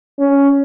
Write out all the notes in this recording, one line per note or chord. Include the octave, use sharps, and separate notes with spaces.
C#4